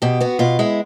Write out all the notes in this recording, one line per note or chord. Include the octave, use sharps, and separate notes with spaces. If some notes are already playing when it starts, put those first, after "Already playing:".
B2 G4
B3 F#4
B2 F4
G#3 E4